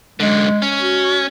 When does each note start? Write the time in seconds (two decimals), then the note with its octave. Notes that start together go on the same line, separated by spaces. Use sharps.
0.20 F#2 D3 G#3
0.62 C#4
0.79 F#4